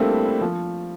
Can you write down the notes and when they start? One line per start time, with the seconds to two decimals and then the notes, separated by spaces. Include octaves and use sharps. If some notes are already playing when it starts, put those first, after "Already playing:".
Already playing: G3 A3 A#3 C4 D4 E4
0.41 F3